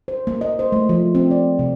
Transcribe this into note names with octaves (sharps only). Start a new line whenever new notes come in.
C5
A#3
D#5
C5
A3
F3
C4
D5
C3